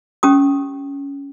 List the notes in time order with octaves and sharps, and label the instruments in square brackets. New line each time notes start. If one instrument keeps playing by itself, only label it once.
[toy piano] C#4 G4 D#6